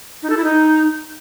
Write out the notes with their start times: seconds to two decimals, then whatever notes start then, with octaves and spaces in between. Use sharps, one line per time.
0.23 D#4
0.30 A4
0.37 E4
0.44 D#4